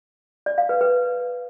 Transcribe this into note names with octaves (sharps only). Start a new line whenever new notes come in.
D5
F5
B4
B4